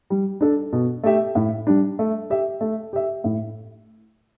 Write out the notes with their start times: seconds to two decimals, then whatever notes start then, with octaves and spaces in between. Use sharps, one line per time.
0.10 G3
0.41 D4 A4
0.72 B2
1.03 A3 G4 E5
1.35 A2
1.67 G3 D4
1.99 A3
2.30 G4 E5
2.61 A3
2.93 G4 E5
3.24 A2